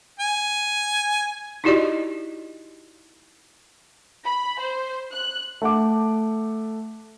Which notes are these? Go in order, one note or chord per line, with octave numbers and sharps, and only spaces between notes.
G#5
D#4 E4 F#4 G4 D5 D#5
B5
C5
F#6
A3 F#5 D6